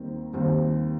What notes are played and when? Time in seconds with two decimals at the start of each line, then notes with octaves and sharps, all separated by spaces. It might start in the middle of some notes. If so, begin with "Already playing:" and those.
Already playing: D#2 D#3 G3 C4
0.33 D#2 D#3 G3 C4